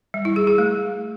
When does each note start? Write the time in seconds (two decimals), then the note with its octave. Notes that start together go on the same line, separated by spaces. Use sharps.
0.14 G3
0.25 E4
0.36 G#4
0.47 G#4
0.58 A3